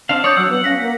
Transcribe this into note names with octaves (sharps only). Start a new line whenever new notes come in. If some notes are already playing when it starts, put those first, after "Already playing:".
C4 D4 F5 A5
C#5 D5 D#6 G6
F#3 F#5 E6
B3
C#4 F5 A#6 B6
A#3